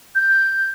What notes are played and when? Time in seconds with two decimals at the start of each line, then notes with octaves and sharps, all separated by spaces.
0.15 G6